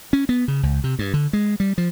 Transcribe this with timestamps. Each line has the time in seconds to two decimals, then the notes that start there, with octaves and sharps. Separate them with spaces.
0.13 C#4
0.29 B3
0.48 C#3
0.63 C#2
0.84 C3
0.99 G2
1.14 D3
1.33 G#3
1.60 G3
1.78 F3